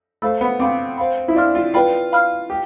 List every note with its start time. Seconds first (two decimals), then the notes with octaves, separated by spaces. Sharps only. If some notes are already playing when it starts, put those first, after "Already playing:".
0.22 A3 C5 F5 B5 E6
0.41 B3
0.60 C4 F5 B5 D6
0.98 C5 F5 B5
1.28 E4
1.36 D4 F5 C6 F6
1.55 F4
1.74 F4 B4 D5 G5 B5
2.12 F5 B5 F6
2.50 G4